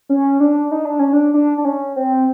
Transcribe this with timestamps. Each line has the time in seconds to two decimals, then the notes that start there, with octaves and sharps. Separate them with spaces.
0.09 C#4
0.40 D4
0.71 D#4
0.85 D4
0.99 C#4
1.13 D4
1.34 D4
1.58 D4
1.65 C#4
1.96 C4